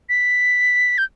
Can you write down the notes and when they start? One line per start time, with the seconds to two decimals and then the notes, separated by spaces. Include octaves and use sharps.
0.09 B6
0.98 G6